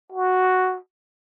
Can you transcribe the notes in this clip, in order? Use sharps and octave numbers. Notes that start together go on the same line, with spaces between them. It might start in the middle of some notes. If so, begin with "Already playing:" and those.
F#4